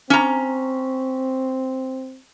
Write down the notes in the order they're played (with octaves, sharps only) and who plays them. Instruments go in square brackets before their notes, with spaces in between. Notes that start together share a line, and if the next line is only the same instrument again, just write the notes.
[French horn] C4 [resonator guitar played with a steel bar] C#4 A#5